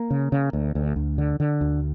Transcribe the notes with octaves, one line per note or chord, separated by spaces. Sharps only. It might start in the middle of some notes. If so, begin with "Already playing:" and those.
Already playing: A#3
C#3
C#3
D2
D2
D2
D3
D3
D2